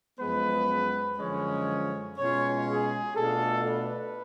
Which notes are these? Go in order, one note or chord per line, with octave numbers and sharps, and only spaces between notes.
F#2 F3 G#3 B3 B4
F#2 D3 F3 G#3 C#4 C#5
B2 G#3 C#4 F4 C#5
G#4
B2 A3 D4 F4 A4
B4